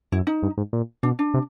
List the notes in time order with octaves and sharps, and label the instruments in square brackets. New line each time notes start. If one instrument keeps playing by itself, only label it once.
[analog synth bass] F#2 [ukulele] E4
[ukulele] D#4
[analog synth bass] G2
G#2
A#2
[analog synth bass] B2 [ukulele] D4
[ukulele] D4
[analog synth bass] C3